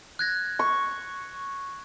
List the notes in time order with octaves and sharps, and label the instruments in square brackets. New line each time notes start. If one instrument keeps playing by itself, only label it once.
[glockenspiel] F#6 G#6 A#6
[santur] C#6